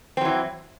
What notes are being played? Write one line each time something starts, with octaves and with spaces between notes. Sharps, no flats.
E3 F#3 C4